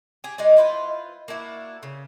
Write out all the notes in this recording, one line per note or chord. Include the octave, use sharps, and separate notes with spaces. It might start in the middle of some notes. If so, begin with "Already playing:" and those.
G4 G#4
G#3 D#4 G4 D5
E4 F4 B4 C5
A#3 D4 E4 F#4
C#3